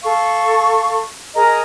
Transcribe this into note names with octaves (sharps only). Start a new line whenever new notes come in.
A4 F5 C#6
G#4 A#4 D#5 A#5